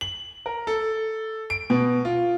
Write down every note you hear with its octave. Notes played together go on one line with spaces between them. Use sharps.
F#7
A#4
A4
D7
B2
F4